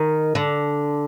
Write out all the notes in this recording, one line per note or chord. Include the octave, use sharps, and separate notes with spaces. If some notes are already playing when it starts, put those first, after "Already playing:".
Already playing: D#3
D3